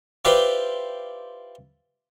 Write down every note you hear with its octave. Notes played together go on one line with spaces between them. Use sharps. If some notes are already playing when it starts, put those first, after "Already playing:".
E4 F4 G4 B4 C5 D5